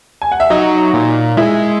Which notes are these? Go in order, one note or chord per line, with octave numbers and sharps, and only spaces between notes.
G#5
F#5
E5
F#3 D#4 D#5
A#2
G#3 E4 E5